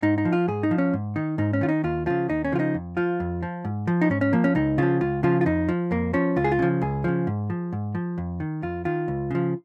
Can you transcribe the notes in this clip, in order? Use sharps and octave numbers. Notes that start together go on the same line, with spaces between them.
G#2 D#4
D#4
F3
F4
G#2 G#4
D#4
F3
C#4
G#2
D#3 D#4
G#2 D#4
C#4
D#3 F4
D#4
D#2 F4
C#3 F3 F4
D#2 D#4
C#4
C#3 F3 F4
D#4
F2
F3 F4
F2
F3
G#2
F3
D#4
G#2 C#4
C#4
F3 A#3
C#4
C#2 D#4
C#3 F3 F4
C#2 F4
C#3 F3 F4
F4
F2 D#4
F3
F2 A#3
F3 C#4
C#2 F4
G#4
F4
C#3 F3
C#2 G#4
C#3 F3
G#2
F3
G#2
F3
F2
D#3
F2 F4
D#3 F4
C#2
C#3 F3